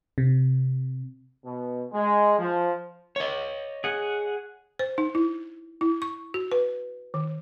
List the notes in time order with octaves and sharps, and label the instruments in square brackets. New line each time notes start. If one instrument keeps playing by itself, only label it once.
[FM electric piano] C3
[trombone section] B2
G#3
F3
[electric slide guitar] C#5 D#5
[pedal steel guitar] G#4 F#5
[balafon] C5
D#4
E4
E4
C#6
F#4
B4
D#3